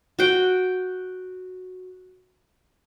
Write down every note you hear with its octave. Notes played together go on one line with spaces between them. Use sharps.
F#4 G5